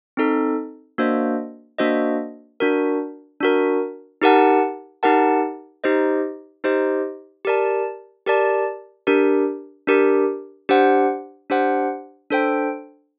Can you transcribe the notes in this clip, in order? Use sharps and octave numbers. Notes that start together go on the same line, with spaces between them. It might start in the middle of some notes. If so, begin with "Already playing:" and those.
C4 D#4 A4
A#3 D4 F#4 C5 D#5
A#3 D4 F#4 C5 D#5
D4 F#4 A#4
D4 F#4 A#4
D#4 G4 A#4 F#5 A5
D#4 G4 A#4 F#5 A5
D#4 G4 C5 D#5
D#4 G4 C5 D#5
G4 A#4 D5 A5
G4 A#4 D5 A5
D4 G4 A#4
D4 G4 A#4
D4 G4 C5 F#5
D4 G4 C5 F#5
D4 A4 C5 G5